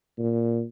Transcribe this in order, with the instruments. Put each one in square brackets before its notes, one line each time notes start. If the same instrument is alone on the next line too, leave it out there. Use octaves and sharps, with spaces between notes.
[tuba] A#2